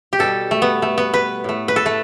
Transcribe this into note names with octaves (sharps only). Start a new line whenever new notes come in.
G4
B2 G3 A4
A3
B3
A3
B3
B4
A2 A3
B4
A4
A3